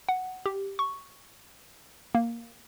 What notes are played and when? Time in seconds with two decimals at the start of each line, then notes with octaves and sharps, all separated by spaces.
0.09 F#5
0.46 G4
0.79 C#6
2.15 A#3